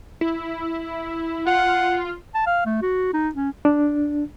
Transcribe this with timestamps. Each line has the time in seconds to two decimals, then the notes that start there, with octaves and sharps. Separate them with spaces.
0.21 E4
1.47 F4 F#5
2.35 A5
2.47 F5
2.66 A3
2.82 F#4
3.14 D#4
3.35 C#4
3.65 D4